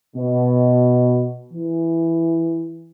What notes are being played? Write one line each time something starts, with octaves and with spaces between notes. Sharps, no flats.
B2
E3